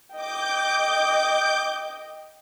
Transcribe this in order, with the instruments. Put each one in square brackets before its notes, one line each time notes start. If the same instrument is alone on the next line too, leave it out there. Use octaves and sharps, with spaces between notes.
[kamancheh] D#5 G5 [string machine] D6 G6